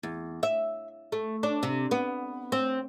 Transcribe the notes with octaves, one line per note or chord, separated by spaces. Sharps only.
E2
E5
A3
D4
C3
B3
C4